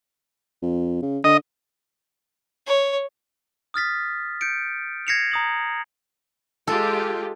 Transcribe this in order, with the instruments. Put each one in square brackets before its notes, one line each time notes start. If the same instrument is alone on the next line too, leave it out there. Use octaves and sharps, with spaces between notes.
[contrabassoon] F2
C#3
[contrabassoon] D3 [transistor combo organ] D#5
[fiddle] C#5
[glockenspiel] D#6 F6 A6 B6
G6 C#7 D7
G#6 A#6 C7 C#7 E7 F7
A#5 D#6 F#7
[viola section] G#3 F4 G4 [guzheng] A4